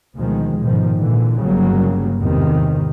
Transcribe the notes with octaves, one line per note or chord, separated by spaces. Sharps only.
D2 B2 D#3 F3 G#3
G#2 B2 D#3 F3
A#2 D3 E3
G1 G2 C#3 F#3 G3 A#3
E2 G#2 C3 D#3 E3